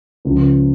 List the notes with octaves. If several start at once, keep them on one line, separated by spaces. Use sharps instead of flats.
C#2 C#3 F3